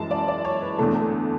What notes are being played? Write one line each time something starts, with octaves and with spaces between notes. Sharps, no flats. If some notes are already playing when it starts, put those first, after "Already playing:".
Already playing: F#2 E3 G#3 A5
D5
D5
C#5
B4
E2 D3 A3 A4
A4